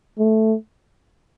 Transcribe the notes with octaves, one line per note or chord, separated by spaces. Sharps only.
A3